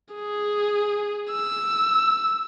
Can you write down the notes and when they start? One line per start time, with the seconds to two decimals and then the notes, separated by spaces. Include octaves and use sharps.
0.14 G#4
1.31 E6